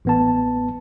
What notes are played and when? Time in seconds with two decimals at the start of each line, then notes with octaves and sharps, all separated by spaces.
0.05 A1 B3 A5